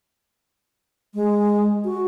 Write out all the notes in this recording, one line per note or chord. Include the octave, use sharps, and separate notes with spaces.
G#3
F#4